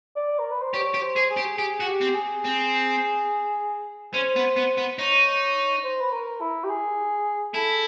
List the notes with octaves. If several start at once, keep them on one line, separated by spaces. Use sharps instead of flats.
D5
A#4
B4
C5
G4 C#5
G4
C5
G#4
G#4
G4
G4 G#4
F#4
G4
C4
G#4
C4
C#4 C5
B3
B3
B3
D#4 C#5
C5
B4
A#4
E4
G4
G#4
E4 A4